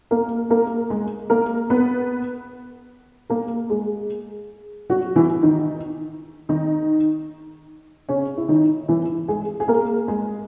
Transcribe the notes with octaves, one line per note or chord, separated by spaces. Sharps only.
A#3 A#4
A#3 A#4
G#3 G#4
A#3 A#4
B3 B4
A#3 A#4
G#3 G#4
F#3 F#4
E3 E4
D#3 D#4
D#3 D#4
C#3 C#4
E4
D#3 D#4
E3 E4
G#3 G#4
G#4
A#3 A#4
G#3 G#4